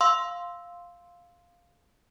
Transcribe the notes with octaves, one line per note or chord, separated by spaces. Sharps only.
F5 C6 E6